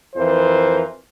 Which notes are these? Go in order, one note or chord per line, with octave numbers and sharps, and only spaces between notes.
F2 E3 A#4 C5